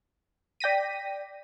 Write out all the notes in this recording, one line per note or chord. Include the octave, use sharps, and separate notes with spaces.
D5 G5 A#6 B6 D#7